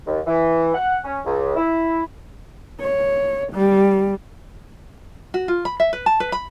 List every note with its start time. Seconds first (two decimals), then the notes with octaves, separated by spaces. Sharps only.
0.07 D#2
0.26 E3
0.74 F#5
1.04 C#4
1.25 C#2
1.56 E4
2.81 C#5
3.53 G3
5.34 F#4
5.48 F4
5.65 B5
5.80 E5
5.93 B4
6.06 A5
6.20 B4
6.32 B5